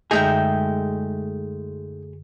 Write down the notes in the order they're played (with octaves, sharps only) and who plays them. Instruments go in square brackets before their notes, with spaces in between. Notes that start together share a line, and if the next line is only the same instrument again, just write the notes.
[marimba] F#2 D3 [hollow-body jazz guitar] G#3 A3 G#4 [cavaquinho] D#4 E5 G5